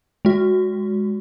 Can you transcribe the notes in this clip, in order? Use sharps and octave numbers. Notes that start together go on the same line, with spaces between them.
G#3 F#4